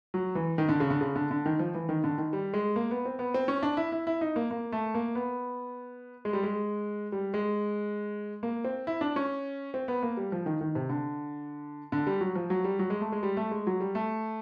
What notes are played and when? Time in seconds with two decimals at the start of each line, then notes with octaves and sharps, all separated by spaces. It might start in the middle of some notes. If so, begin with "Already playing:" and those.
0.14 F#3
0.35 E3
0.58 D#3
0.69 D3
0.80 C#3
0.90 D3
1.01 C#3
1.16 D3
1.31 D3
1.46 D#3
1.59 F3
1.74 E3
1.89 D#3
2.04 D3
2.18 D#3
2.33 G3
2.54 G#3
2.76 A#3
2.91 B3
3.05 C4
3.19 B3
3.34 C4
3.48 C#4
3.63 D4
3.77 E4
3.92 E4
4.07 E4
4.21 D#4
4.36 A#3
4.51 A#3
4.72 A3
4.94 A#3
5.15 B3
6.25 G#3
6.33 G3
6.43 G#3
7.12 G3
7.34 G#3
8.43 A#3
8.64 C4
8.87 E4
9.01 D4
9.16 C#4
9.74 C4
9.88 B3
10.03 A#3
10.17 G3
10.32 F3
10.46 D#3
10.61 D#3
10.75 C3
10.89 D3
11.92 D3
12.07 G3
12.21 F#3
12.36 F3
12.50 F#3
12.64 G3
12.79 F#3
12.90 G#3
13.01 A3
13.12 G#3
13.23 G3
13.37 A3
13.51 G#3
13.67 F#3
13.80 G3
13.95 A3